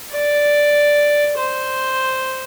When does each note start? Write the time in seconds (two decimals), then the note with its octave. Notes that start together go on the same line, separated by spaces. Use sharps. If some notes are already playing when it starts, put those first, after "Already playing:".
0.12 D5
1.37 C5